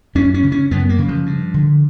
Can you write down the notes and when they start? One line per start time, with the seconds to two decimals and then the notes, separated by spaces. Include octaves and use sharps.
0.15 F#2 C#4
0.34 C#4
0.44 C#3
0.52 C#4
0.71 F#2 B3
0.89 A#3
0.98 C#3
1.09 F3
1.26 G2
1.54 D3